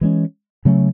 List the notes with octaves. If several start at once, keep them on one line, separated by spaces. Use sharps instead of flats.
E3 G#3 C#4
C#3 F#3 A3 C#4